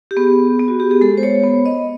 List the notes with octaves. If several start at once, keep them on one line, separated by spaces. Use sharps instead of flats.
G4
B3 G#4
B3
F#4
G4
G#4
G#3 A4
C5
C#5
B3
D#5